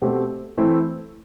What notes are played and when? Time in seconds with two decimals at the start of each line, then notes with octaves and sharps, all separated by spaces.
0.02 B2 A3 C4 G4
0.58 E3 A3 C4 E4